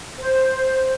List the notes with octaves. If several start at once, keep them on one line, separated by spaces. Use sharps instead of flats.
C5